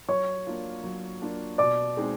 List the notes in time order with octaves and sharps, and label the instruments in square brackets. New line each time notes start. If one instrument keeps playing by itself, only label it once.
[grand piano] F#3 [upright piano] C#5 C#6
[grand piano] A#3 D4 F4
F#3
A#3 D4 F4
[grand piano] B2 [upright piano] D5 D6
[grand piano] G#3 C4 D#4 G#4